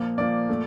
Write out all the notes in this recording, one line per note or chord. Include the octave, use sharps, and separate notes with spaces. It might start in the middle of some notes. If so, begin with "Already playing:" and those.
Already playing: A#2 F3 A#3
A#2 F3 A#3 D5
A#2 A3